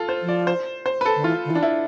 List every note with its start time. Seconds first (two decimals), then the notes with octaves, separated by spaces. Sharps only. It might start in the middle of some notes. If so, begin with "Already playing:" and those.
Already playing: F4 A4
0.09 C5
0.22 F3
0.29 D5
0.47 C5
0.86 C5
1.01 B4
1.05 A4
1.16 D3
1.24 E3 F4
1.45 D3
1.50 E3
1.55 D4
1.63 E4